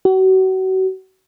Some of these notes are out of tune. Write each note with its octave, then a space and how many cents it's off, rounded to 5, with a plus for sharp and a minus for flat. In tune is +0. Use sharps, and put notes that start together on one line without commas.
F#4 +35